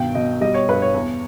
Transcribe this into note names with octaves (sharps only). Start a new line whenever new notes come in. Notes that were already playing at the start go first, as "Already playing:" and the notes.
Already playing: G2 B2 D#3 G5
B2 D#5
G3 D#5
C#5
G2 B4
C#5
E2